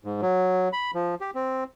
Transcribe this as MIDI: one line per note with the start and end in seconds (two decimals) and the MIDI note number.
0.05 0.21 44
0.22 0.69 54
0.73 0.91 83
0.94 1.15 53
1.21 1.31 67
1.35 1.64 60